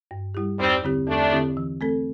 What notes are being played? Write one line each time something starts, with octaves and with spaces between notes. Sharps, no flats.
G2
G3 E4 G4
E2 G3 C4
D3 C4 E4 G4
E2 A3 D4
D3 C4 E4 G4
E3
A3 C4 A4